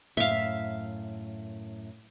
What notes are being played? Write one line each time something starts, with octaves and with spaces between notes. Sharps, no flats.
F#2 A2 E5 F5